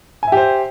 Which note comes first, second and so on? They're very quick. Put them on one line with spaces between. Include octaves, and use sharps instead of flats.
G#5 E5 G4 C5